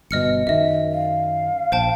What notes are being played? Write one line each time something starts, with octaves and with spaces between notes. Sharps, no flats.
G1 B2 D#5 F6 C#7
F#2 D#3 D#5 E5
F5
A#1 C5 G5 A5